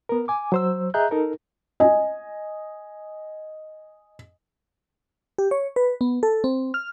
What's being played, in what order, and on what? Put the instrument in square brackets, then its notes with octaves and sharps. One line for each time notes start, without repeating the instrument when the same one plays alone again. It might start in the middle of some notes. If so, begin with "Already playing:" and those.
[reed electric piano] B3 A#4
G#5 D6
F#3 C5 E6
G#4 D#5 E5 A#5 F#6 G6
D#4 A4 A#4
[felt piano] D#5 G#5
[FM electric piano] G4
C#5
B4
B3
A4
C4
F6